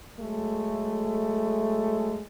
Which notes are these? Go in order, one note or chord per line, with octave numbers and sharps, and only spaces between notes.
F#3 G#3 A3